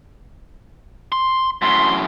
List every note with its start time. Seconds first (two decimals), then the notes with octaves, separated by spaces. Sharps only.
1.12 C6
1.62 F#2 A2 C6